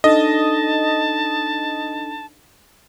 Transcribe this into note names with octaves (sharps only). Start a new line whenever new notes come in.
D4 D#4 A4 D#5 A5